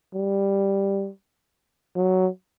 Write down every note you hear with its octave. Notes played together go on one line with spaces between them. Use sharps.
G3
F#3